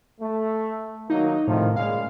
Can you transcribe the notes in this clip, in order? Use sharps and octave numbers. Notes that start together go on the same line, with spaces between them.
A3
D#3 F#3 A#3 D#4
A2 C3 D#3 F3
A#2 C#3 G#3 F5